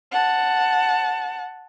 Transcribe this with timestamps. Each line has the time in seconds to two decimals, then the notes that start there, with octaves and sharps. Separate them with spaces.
0.12 F#5 A5